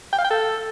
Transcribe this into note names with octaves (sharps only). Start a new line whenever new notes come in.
G5
F5
G5
A4